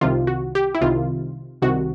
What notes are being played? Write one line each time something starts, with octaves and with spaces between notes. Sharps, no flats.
C2 C3 D#3 F4
F#4
G4
E4
C2 C3 D#3 F4
C2 C3 D#3 F#4